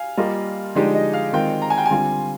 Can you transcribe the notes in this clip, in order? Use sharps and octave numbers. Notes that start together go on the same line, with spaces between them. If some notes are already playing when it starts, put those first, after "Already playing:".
Already playing: F5 G#5
G3 A#3 F4 A#4 D#5
D3 F3 G#3 D#4 G4 D5
D#5
F5
D#3 G#3 C4 F4 G5
A#5
G#5
G5
G#5
D3 G3 C4 F4